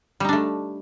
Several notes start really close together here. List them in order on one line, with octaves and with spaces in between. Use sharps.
G3 D#4 D4 A3